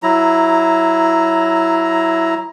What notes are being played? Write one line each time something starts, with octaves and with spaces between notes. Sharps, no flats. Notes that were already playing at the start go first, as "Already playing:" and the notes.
F#3 E4 A#5